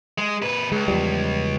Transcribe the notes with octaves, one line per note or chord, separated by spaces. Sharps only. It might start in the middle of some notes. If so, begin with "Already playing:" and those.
G#3
A#2 B4
C#2 G#3
E2 F3 G3